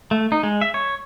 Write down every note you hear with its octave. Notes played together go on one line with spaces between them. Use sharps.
A3
D#4
G#3
E5
C#5